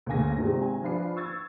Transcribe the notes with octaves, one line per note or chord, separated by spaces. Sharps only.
D2 C#3 A#3 G#5 A#6
G#1 C3 G#3
G#5
F3 D4 F4 B4 D5 C7
C#6 E6 G#6 A6